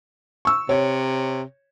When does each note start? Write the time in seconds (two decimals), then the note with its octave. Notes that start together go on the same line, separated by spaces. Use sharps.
0.45 C#6 E6
0.69 C3 C#5